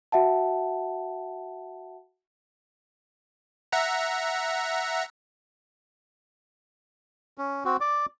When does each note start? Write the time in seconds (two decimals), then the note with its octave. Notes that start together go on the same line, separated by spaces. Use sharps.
0.12 F#4 E5 F#5 A5
3.72 E5 F#5 A#5
7.38 C#4
7.65 C4 F#4
7.81 D5 D6